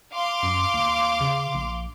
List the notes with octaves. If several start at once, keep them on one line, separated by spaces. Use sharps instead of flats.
F5 C6 D6
F#2
D#2
C#3
A#1